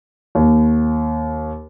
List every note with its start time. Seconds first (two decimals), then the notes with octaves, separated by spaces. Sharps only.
0.35 D#2